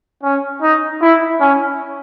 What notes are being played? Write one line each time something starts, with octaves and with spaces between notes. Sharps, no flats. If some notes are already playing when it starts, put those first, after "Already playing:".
C#4
D#4
E4
C#4